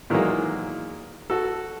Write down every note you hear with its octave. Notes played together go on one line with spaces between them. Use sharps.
A#2 D#3 E3 F#3 G#3 A#3
F#4 A4